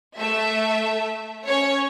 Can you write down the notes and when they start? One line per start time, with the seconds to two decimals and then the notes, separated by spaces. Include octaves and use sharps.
0.17 A3 E5
1.47 C#4 C#5